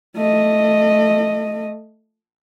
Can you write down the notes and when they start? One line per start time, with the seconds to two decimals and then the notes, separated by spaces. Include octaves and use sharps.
0.16 A3 D#5